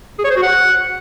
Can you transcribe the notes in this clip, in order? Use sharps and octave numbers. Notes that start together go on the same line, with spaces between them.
G#4
C#5
C5
F#4
F#5